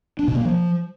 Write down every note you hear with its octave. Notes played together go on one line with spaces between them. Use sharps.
D4
B2
A#3
F3